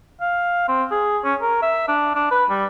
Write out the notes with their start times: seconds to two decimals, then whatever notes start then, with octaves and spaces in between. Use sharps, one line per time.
0.21 F5
0.68 C4
0.91 G#4
1.24 C#4
1.42 A#4
1.62 E5
1.88 D4
2.15 D4
2.31 B4
2.50 G3